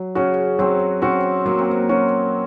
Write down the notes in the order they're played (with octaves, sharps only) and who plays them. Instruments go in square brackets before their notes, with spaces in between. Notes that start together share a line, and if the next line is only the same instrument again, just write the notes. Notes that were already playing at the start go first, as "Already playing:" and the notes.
Already playing: [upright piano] F#3
[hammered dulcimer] C#3 [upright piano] C#4 F#4
[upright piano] F#3 [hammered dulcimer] C4
[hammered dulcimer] C4 [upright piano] C#4 F#4
[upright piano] F#3 [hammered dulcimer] A#3
[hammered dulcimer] C4
A#3
[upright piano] C#4 F#4